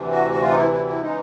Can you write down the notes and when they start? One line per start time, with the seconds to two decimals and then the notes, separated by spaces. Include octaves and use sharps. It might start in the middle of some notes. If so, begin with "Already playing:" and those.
Already playing: D2 C3 E3
0.11 F#4
0.31 F#4
0.41 F4
0.50 D#4
0.56 E4
0.71 E4
0.86 E4
1.01 C#3 E3 G#3 D#4